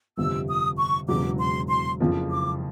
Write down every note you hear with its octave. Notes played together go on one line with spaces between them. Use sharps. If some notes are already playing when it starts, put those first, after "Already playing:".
G1 F2 C3 E6
D#6
C#6
E1 E2 C#3 F#3 D6
C6
C6
F#1 F2 C#3 F3
D6